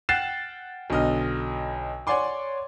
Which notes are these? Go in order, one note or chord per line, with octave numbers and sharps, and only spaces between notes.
F#5 G5 F#6 A6 C7 E7
B1 D3 D#5 F6
C#5 D5 F#5 G#5 C6 D6